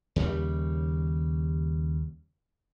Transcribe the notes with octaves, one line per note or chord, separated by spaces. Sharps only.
D#2 C#3 G3